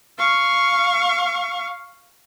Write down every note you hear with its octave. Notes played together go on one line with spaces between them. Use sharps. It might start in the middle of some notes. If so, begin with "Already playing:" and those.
F5 C#6